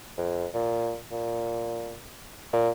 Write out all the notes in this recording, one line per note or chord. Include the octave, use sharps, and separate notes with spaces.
F2
A#2
A#2
A#2